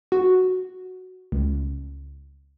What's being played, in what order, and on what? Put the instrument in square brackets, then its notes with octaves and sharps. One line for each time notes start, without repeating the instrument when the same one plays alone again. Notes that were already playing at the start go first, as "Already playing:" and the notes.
[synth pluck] F#4
C#2